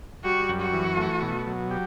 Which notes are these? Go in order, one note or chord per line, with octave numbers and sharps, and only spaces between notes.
G3 F#4
F#2
F#4
E3
A3
B2
F#3
G4